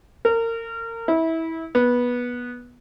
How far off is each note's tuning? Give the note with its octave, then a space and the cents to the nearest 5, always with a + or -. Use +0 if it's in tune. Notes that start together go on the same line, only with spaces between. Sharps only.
A#4 -30
E4 -25
B3 -15